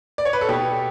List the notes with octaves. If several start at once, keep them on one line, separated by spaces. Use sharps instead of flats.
D5
C#5
B4
A4
B2 G4